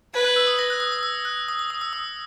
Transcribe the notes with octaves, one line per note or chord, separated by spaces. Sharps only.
B4 G#6
F#6
E6
D#6
A#6
F#6
D#6
D#6
E6
F#6
D#6
D#6
D#6
E6
D#6